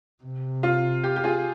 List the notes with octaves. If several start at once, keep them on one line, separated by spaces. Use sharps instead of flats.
C3
F4
G4
G4
F4 G#4